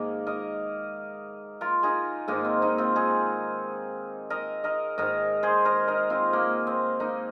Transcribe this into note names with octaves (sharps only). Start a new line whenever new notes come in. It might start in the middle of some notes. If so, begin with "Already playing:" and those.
Already playing: G#2 D#3 A#3
A#4 D#5
F4 A#4
D#4 G#4
G#2 D#3 A#3 D#4
C4
A#3 D#4
C4 F4
D#4 G#4
A#4 D#5
A#4 D#5
G#2 D#3 A#4 D#5
G#4 C5
A#4 D#5
A#4 D#5
C4 F4
A#3
C4
A#3 D#4